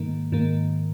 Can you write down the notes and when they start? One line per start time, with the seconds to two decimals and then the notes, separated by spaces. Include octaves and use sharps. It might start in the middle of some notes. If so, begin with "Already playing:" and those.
Already playing: G#2 D#3 A#3
0.32 G#2 D#3 A#3